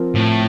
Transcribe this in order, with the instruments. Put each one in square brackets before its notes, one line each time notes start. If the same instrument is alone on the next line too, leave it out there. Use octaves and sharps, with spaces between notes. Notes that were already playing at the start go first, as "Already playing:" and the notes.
Already playing: [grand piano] F3 C4 F4 A#4
[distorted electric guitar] A2